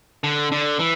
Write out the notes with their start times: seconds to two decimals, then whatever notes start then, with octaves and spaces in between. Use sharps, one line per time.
0.24 D3
0.52 D3
0.79 E3